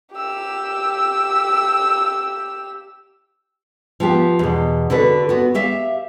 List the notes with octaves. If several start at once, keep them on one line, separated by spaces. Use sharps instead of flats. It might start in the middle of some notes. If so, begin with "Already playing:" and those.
G4 E6
F3 B3 G4
E2 B2
D3 F#4 A4 B4
B3 F#4
G4 E5 F5